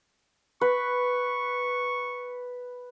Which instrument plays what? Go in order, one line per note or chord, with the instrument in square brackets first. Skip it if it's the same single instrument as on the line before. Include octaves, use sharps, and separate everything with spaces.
[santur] B4 [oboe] C#6